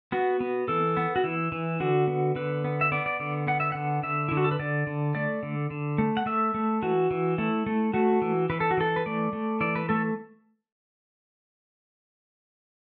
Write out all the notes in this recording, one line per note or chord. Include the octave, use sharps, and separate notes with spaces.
B3 F#4
B3
E3 A4
B3
F#4
E3 E4
E3
D3 F#4
B3
D3 B4
B3
E5
B3 D5
D5
D3 D5
B3 F#5
E5
D3 F#5
D3 E5
E4
D3
F#4
A4
B4
D3 D5
D3
A3 D5
D3
D3
A3
F#5
A3 E5
A3
E3 F#4
E3
A3 E4
A3
A3 F#4
E3
E3 B4
A4
F#4
E3 A4
B4
A3 D5
A3
E3 D5
B4
A3 A4